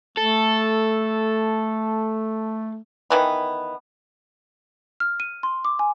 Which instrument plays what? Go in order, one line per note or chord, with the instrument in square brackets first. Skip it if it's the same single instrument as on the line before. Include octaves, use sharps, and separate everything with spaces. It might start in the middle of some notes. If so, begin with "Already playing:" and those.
[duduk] A3 [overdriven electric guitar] A4
[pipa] D#3 E3 B3
[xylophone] F6
D#7
C6
D6
G#5